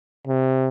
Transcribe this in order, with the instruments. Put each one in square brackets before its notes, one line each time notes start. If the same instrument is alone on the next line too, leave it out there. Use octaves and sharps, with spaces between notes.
[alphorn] C3